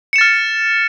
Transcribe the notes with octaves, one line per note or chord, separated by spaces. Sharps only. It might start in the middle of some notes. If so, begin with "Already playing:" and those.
F6 A6 C#7 E7